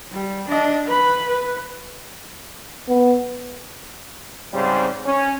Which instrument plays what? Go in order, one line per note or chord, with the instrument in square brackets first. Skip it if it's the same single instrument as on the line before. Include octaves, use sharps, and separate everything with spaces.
[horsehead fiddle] G3
D4 D#5
B4 B5
B4
[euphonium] B3
[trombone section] G#2 C#3 G3 C4 G4 C5
C#4